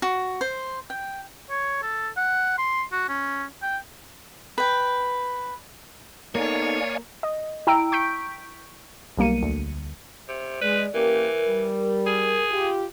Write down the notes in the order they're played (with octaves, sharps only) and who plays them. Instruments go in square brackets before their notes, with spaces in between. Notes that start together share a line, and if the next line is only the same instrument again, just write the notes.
[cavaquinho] F#4
C5
G5
[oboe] C#5
A4
F#5
C6
F#4
C#4
G5
[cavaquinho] B4 G5
[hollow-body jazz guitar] A#3 [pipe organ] B3 D#4 A4 [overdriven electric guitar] C#5 [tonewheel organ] D5 F5 G#5
[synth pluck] D#5
E4 G5 A#5 E6 D7
C#6 G6 B6 D7
B1 G3 A#3 C#7 D#7
D2
[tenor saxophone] C3
[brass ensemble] G#3 [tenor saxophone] B4 [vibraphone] D5
[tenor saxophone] E3 [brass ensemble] A#3 C#4 G4 [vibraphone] A#4
[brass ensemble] G3
[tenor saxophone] G#4
[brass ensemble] F4 G4